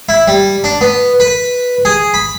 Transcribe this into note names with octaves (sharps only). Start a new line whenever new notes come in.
E4
G3
D4
B3
B4
G#4
B5